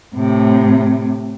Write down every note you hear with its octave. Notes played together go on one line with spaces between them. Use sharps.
A2 C3